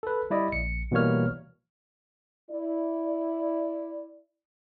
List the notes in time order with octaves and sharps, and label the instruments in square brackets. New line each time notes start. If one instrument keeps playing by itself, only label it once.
[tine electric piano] A4 B4
G3 E4 D5 D#5
A#1 C#7
B2 E3 G3 A#3 C#5 F6
[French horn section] E4 D5